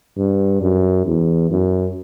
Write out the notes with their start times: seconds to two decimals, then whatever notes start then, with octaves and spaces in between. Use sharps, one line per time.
0.17 G2
0.62 F#2
1.06 E2
1.50 F#2